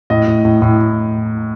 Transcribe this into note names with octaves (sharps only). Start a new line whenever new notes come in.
A2 D#5
A2
A2
A2